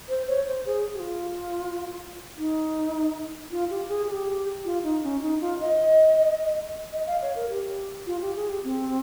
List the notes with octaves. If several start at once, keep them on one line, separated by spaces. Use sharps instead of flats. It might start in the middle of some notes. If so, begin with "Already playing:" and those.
C5
C#5
C5
G#4
G4
F4
D#4
F4
G4
G#4
G#4
G4
F4
D#4
C#4
D#4
F4
D#5
D#5
F5
C#5
A#4
G4
F4
G4
G#4
G4
C4